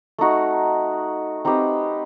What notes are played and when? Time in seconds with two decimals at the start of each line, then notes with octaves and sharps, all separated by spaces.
0.18 A3 D#4 F#4
1.45 C4 D#4 G4 B4